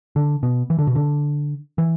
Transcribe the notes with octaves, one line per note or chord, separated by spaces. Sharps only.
D3
B2
E3
D3
B2
D3
E3